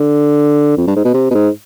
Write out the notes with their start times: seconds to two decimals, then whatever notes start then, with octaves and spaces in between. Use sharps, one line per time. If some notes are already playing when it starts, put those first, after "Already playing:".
Already playing: D3
0.77 F2
0.87 G2
0.96 G#2
1.05 B2
1.14 C3
1.30 B2
1.34 G#2